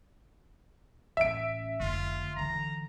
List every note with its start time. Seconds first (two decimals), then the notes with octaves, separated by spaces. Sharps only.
1.17 A1 C#4 E5 D7
1.80 F1 D3 F4
2.36 D3 E3 A#5